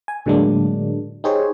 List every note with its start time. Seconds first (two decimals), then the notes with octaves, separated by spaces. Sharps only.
0.08 G#5
0.26 A2 D3 F#3 G#3 A#3 D4
1.24 D#4 G4 G#4 C5 C#5